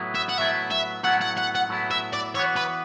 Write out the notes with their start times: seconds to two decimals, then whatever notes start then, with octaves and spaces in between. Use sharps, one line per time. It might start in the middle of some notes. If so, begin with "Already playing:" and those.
Already playing: A2 F#3 B3 E4
0.15 E5
0.29 F#5
0.38 A2 F#3 B3 E4 E5
0.71 E5
1.03 A2 F#3 B3 E4 F#5
1.21 F#5
1.37 F#5
1.55 F#5
1.69 A2 F#3 B3 E4
1.91 E5
2.13 D5
2.35 E3 B3 F#4 C#5
2.56 B4